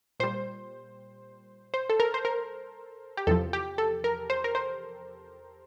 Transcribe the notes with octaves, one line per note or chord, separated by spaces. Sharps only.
A#2 G3 C5
C5
A4
A#4
C5
A#4
G4
E2 C3 F3 A4
G4
A4
A#4
C5
A#4
C5